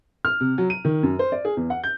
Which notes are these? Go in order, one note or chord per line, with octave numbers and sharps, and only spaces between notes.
F6
C3
F#3
D#7
D#3
F#2
C5
D5
G#4
E2
F#5
G6